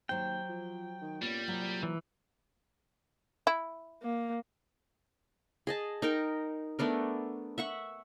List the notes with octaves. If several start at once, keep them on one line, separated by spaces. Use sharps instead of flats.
D#2 F#3 C5 G5
F3
D#3
A#2 G3 B3 C#4
C3 F#3
E3
E4
A#3
G#4 D#5 A5
D#4 A#4 G5
A3 B3 D4 A#4
E5 F#5 C#6